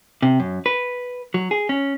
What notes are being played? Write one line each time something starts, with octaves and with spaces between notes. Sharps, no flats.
C3
F#2
B4
F#3
G#4
C#4